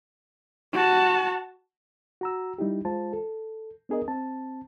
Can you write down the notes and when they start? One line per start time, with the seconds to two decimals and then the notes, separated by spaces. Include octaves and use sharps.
0.73 F#4 A5
2.21 F#4 A#5 E6
2.58 G3 D#4 E4 G4
2.85 G#3 F4 C5 A5
3.13 A4
3.89 B3 D4 G#4 A#4 D#5
4.08 C4 A5